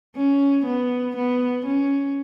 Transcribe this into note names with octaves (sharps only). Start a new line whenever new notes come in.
C#4
B3
B3
C#4